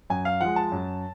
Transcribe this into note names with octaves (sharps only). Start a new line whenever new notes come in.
F#2 G#5
F5
F3 G#3 F#5
A5
F#2